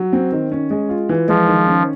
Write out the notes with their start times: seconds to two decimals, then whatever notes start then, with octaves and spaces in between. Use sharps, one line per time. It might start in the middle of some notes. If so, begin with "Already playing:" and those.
Already playing: F#3
0.13 C4
0.32 D#3
0.52 C#4
0.70 G#3
0.89 F4
1.09 E3
1.28 F3 G#3
1.48 D#3
1.67 C#4